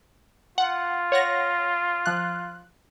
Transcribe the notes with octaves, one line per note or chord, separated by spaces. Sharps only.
F4 F#5
C#5 F#5 A#6
F3 F#6